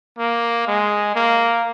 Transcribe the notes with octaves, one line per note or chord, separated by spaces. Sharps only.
A#3
G#3
A#3